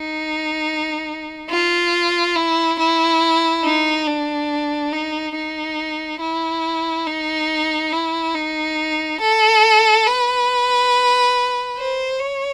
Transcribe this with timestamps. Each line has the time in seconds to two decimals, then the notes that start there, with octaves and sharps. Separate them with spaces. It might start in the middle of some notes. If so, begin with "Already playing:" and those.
Already playing: D#4
1.50 F4
2.36 E4
2.79 E4
3.64 D#4
4.07 D4
4.93 D#4
5.36 D#4
6.21 E4
7.07 D#4
7.93 E4
8.35 D#4
9.21 A4
10.06 B4
11.78 C5
12.20 C#5